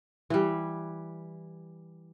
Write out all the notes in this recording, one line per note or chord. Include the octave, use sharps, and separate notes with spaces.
E3 G3